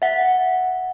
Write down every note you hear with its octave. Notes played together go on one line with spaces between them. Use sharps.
E5 F#5